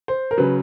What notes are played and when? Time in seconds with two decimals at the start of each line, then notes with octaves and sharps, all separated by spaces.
0.08 C5
0.31 A#4
0.38 C#3 F#3 B4